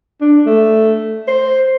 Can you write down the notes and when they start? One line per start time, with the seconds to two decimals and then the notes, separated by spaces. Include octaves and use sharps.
0.21 D4
0.46 A3
1.28 C5